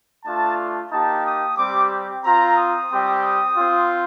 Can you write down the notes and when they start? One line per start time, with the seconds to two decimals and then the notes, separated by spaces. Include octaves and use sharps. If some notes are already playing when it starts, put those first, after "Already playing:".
0.25 A3 D4 F4 A5
0.92 A#3 D#4 G4 A5
1.25 D#6
1.58 G3 C4 G4 D6
2.24 C4 F4 A#5
2.57 D#6
2.91 G3 C4 G4
3.24 D#6
3.57 C4 F4